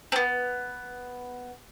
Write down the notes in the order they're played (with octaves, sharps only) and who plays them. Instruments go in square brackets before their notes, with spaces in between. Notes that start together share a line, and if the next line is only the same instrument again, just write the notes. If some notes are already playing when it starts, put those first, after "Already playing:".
[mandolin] B3 C4